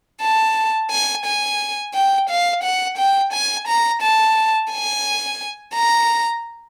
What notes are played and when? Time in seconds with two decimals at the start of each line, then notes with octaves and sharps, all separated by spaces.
0.21 A5
0.91 G#5
1.25 G#5
1.94 G5
2.29 F5
2.63 F#5
2.97 G5
3.33 G#5
3.67 A#5
4.02 A5
4.71 G#5
5.74 A#5